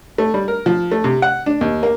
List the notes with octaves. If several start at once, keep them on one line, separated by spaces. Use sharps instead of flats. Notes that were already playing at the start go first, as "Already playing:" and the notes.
A3
G3
A#4
F3
A3
C3
F#5
D4
D#2
A#3